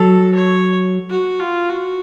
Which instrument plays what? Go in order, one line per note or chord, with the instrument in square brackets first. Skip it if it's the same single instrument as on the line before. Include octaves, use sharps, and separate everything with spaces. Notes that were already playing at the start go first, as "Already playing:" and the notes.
Already playing: [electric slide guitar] F#3 [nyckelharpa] A4
[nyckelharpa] C#5
F#4
F4
F#4